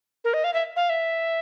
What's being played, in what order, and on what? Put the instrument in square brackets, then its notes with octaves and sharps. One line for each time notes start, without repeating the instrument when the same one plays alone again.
[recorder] A#4
D#5
F5
E5
F5
E5